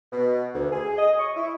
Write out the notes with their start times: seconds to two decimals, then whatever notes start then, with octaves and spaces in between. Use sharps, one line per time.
0.12 B2
0.54 D2
0.72 G#4
0.98 D#5
1.19 C#6
1.36 E4